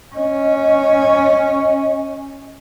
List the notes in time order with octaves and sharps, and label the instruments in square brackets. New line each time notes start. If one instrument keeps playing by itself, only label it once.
[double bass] C#4 [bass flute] D#5